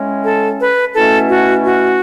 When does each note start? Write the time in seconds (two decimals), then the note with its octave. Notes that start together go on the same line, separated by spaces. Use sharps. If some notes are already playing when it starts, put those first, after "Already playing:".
Already playing: A2 G#3 C#4
0.25 A4
0.60 B4
0.95 B2 A3 C#4 E4 A4
1.30 F#4
1.64 F#4